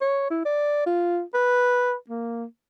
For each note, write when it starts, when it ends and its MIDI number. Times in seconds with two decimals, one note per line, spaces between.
0.01 0.30 73
0.30 0.42 64
0.45 0.82 74
0.86 1.21 65
1.34 1.94 71
2.09 2.45 58